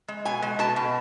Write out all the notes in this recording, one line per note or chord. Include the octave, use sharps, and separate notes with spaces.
G#3
B2 G#5
G#3
B2 A5
B2